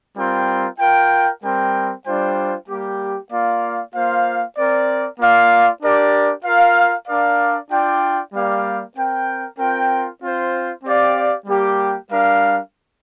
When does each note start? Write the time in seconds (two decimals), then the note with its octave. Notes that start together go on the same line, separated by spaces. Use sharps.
0.17 G3 C4 F4 A#4 G5
0.80 F4 A#4 G5
1.43 G3 C4 A#4 G5
2.06 G3 D4 F4 C5 G5
2.68 G3 A#3 G4
3.31 A#3 F4 D5 F5
3.93 A#3 F4 C5 F5
4.56 C4 A#4 D5
5.19 A#3 F4 D5 F5
5.82 D4 G4 A#4 D5
6.44 F4 A#4 F5
7.08 D4 A#4 D5 F5
7.70 D4 F4 D5 G5
8.32 G3 A#3 G4 D5 F5
8.96 C4 A#4 G5
9.58 C4 F4 A#4 G5
10.21 C4 F4 C5
10.83 C4 G4 D5 F5
11.46 G3 A#3 G4
12.10 G3 D4 A#4 F5